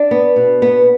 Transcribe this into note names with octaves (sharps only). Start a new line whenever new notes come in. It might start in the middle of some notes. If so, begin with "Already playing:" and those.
Already playing: D4 D5
B3
B2
B3